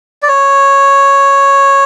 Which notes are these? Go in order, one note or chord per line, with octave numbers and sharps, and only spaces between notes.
D5
C#5